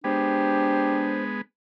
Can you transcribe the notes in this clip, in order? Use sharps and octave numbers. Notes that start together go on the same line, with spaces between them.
G#3 B3 D4 G4 C5